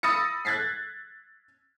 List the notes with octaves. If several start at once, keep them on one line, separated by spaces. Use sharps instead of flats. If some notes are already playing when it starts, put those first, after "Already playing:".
B5 D#6 E6 A6 A#6 C#7
F#6 G#6 A6 B6 C7